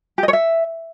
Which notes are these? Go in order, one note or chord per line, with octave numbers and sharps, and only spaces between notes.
G4
D#5
C#5
E5